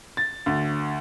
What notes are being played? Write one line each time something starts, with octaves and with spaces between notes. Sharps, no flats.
A6
D2